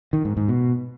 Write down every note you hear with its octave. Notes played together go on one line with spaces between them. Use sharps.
D#3
G#2
G#2
B2